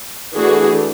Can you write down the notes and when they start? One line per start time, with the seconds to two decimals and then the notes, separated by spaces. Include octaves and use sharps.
0.34 E3 A3 D4 F#4 G#4